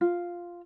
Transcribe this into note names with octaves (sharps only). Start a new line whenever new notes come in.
F4